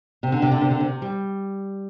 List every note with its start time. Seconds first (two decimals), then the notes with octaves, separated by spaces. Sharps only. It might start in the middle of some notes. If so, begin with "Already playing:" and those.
0.23 C3
0.32 D3
0.42 C3
0.51 D3
0.61 C3
0.70 D3
0.80 C3
1.02 G3